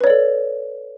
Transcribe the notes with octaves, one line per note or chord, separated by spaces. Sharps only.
A4 B4 C#5 D5